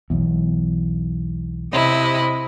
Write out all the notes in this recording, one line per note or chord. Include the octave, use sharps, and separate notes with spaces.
B1 E2
C3 E4 D#5